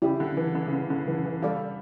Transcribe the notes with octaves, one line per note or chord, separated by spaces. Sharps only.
C#3 E4 G4 D5
D3
E3
D3
C#3
D3
D3
E3
E3
G3 A4 D5 F5